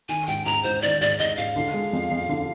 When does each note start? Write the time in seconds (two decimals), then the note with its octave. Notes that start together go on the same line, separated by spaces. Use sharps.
0.09 D#3 G#5
0.27 G#2 G5
0.45 G#2 A#5
0.63 G#2 C5
0.82 D#3 D5
1.01 G#2 D5
1.18 G#2 D#5
1.37 G#2 F5
1.56 D3
1.74 G#3
1.93 F2
2.11 F2
2.29 D3